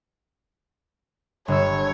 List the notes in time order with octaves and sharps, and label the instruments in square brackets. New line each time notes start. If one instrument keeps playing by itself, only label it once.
[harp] G1 E6 [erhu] C#5